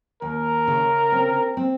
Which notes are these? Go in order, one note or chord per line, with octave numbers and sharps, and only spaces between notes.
D#2 A#4
C#3
C4
C4